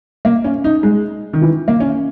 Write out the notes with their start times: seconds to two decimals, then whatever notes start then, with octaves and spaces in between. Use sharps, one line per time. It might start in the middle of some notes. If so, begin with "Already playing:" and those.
0.25 A#3
0.44 C#4
0.64 D#4
0.83 G#3
1.33 D#3
1.42 E3
1.68 A#3
1.80 C#4